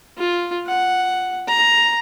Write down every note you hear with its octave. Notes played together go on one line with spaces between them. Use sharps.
F4
F#5
A#5